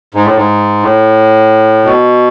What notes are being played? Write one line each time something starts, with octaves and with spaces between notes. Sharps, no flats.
G#2
A2
G#2
A2
B2